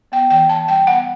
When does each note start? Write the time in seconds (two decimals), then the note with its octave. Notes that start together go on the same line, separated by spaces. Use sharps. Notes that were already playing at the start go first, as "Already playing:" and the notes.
0.12 B3 G5
0.30 E3 G5
0.49 E3 A5
0.68 G3 G5
0.87 B3 F#5